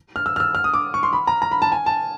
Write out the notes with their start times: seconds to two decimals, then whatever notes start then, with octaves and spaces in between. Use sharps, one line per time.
0.16 F6
0.26 E6
0.36 F6
0.40 E6
0.55 F6
0.64 D#6
0.74 D6
0.94 C#6
1.03 C6
1.13 B5
1.27 A#5
1.42 A#5
1.52 B5
1.62 A5
1.72 G#5
1.86 A5